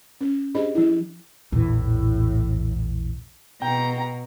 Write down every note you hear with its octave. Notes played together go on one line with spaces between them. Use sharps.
C#4
D4 G4 G#4 C5 D#5 B5
F3 E4
A#1 E2 A2 E3
B2 G5 A#5